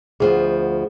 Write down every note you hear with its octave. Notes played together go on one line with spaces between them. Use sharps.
D2 F3 B3 G#4